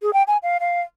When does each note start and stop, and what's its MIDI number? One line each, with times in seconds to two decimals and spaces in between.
0.02 0.13 68
0.13 0.23 79
0.27 0.37 80
0.43 0.58 77
0.60 0.82 77